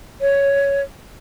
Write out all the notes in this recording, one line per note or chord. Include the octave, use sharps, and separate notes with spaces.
C#5